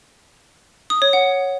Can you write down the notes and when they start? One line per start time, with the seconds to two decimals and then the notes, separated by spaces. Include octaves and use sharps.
0.90 D#6
1.02 C#5
1.13 F#5